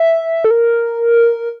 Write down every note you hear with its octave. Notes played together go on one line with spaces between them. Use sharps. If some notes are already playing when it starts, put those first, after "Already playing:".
Already playing: E5
A4
A#4